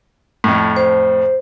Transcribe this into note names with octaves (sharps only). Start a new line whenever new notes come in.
F2 A2
C5